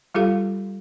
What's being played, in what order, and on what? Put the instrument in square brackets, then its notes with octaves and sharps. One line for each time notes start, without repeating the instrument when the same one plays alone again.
[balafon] G3 F4 G4 A4 F5